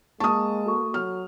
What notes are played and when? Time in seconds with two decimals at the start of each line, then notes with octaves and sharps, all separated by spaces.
0.20 G#3 A#3 A5 C#6 D#6
0.66 F#4 A4 C#6
0.94 F#3 F6